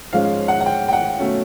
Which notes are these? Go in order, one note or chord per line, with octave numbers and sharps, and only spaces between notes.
G#2 F3 G#3 C#4 F5
F#5
F#5
G5
G5
F#5
B2 F#3 A3 C#4